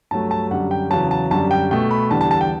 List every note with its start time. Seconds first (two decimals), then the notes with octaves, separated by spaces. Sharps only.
0.11 G2 F#3 A3 A5
0.31 A5
0.51 F#2 D3 G3 F#5
0.71 G5
0.90 E2 C#3 F#3 A5
1.11 A5
1.31 F#2 D3 G3 A5
1.51 G5
1.71 B2 A3 G5
1.91 B5
2.11 E2 D3 G3 A5
2.21 A5
2.31 A5
2.41 G5